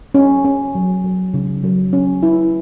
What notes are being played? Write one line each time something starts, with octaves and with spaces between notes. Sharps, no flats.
C#4
C#4
F#3
F#3
C#3
F#3
C#4
E4